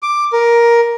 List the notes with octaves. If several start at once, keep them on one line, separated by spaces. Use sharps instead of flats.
D6
A#4